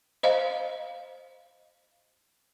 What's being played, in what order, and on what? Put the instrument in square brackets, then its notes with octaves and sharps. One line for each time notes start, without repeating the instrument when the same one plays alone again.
[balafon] C5 D#5 F5